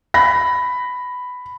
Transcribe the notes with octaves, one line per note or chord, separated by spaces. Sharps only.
B5 A#6